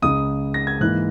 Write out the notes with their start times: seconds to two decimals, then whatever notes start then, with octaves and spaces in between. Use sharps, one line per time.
0.02 C#2 C#3 G#3 D#6
0.54 A#6
0.67 G#6
0.80 G#2 E3 A#3 F#6